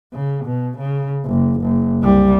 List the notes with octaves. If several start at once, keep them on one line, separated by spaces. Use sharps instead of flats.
C#3
B2
C#3
F#1
F#1
C2 G3